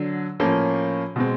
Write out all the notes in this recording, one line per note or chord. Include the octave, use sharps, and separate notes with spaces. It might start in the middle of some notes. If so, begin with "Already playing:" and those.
Already playing: D3 F#3
A2 F3 A#3 C#4
B2 G#3 C4